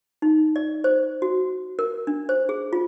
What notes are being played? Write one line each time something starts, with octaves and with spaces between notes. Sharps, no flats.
D#4
D5
C5
F#4
A#4
D4
C5
G#4
F4